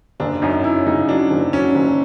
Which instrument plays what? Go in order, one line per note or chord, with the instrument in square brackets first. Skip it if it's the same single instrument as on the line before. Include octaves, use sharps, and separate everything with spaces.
[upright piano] F#1 [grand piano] D4
[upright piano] F#2 [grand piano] D#4
[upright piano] F#2 [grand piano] E4
[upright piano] C#3 [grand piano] D#4
[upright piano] F#3 [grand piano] D4
[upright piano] F#1
[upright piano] F#3 [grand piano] C#4
[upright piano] F#1